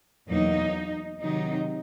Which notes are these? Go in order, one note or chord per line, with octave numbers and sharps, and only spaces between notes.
E2 B2 F#3 A#3 D#4
C3 D#3 F#3 D#4